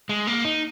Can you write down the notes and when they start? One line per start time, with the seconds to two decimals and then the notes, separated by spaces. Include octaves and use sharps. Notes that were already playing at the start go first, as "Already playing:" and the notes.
0.09 G#3
0.27 A#3
0.45 D#4